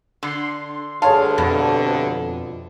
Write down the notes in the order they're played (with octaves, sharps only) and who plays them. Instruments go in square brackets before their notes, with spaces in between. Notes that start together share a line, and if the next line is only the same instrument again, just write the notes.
[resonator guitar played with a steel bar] D3 [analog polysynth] C6
[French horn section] D2 G2 D3 [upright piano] G#4 C#5 A5 [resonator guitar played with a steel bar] F5
[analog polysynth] F2 [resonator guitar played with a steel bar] B2